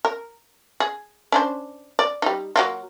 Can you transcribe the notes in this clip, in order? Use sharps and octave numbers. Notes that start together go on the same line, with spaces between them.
A#4
G#4
C#4 D4 C5
D5
G3 D#4
F#3 A#3 F4